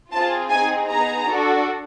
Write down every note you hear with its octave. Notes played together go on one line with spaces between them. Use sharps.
C4 F4 G#4 A5
C4 D#4 G#4 G#5
B3 D#4 G#4 A#5
D4 F#4 A4